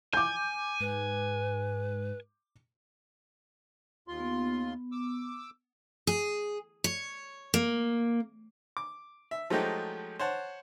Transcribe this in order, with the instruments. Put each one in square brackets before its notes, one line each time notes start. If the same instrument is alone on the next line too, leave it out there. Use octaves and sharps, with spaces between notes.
[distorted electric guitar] G#5 [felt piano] D6 G6
[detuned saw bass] G#2 [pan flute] B4
[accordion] D#2 F4 C6
[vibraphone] B3
[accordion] D6 E6
[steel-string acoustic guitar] G#4
C#5
A#3
[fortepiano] D6
E5
F3 F#3 G#3 A3 D#4 G4
C5 C#5 F#5 A5